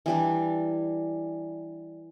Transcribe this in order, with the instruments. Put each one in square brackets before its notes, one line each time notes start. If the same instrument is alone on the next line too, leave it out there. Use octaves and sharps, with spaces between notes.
[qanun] E3 G3 D4